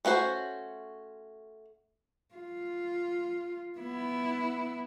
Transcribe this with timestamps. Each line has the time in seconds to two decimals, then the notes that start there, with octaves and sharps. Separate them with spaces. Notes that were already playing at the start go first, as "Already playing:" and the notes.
0.05 A3 C#4 F#4 C5
2.34 F4
3.79 B3 E4